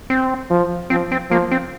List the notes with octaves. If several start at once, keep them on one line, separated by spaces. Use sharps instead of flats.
C4
F3
F3 C4
C4
F3 A#3
C4